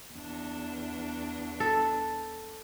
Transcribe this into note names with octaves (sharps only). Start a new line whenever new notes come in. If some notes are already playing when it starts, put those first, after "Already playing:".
E2 D4
A4